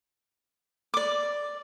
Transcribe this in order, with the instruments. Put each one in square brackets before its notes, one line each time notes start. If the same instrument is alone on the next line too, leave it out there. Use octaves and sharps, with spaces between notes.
[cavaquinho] D5 D6